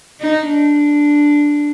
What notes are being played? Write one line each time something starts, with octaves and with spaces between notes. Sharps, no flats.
D#4
D4